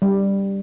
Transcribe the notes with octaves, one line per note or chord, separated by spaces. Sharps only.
G3